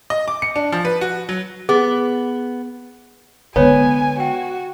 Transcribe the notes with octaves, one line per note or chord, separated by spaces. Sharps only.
D#5
D6
C#7
D4
F3
B4
F#4
F#3
B3 G#4
D3 G#3 B3 C#5 G#5
F#4 G5